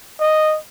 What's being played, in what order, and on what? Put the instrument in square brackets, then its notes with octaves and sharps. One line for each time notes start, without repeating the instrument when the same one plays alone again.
[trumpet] D#5